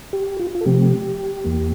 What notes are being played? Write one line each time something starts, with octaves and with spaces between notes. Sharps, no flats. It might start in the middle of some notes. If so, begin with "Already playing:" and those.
G4
F4
F4
A4
C3 F3 A3 C4 G4
E2 E3 A#3